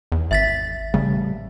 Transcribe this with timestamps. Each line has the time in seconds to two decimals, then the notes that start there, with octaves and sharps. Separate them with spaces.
0.12 E2
0.31 G#1 E5 A6 B6
0.94 A1 C#3 G3 A3